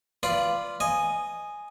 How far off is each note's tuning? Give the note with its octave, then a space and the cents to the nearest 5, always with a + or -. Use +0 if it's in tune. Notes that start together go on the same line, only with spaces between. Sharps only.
F4 -10 B4 +0 D5 +0
D#5 -10 G#5 +0